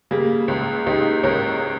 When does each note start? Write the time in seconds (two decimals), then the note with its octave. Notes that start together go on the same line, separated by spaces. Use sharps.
0.11 C#3 G3 A#3
0.48 C#2
0.86 C#2 D#4 G4
1.23 C#2 A#4 C#5